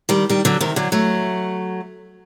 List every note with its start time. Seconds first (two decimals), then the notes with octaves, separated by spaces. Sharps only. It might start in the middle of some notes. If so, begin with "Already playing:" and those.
0.09 D#3 G3
0.29 D#3 G3
0.45 D3 F#3
0.61 C3 D#3
0.76 D3 F#3
0.92 F#3 A3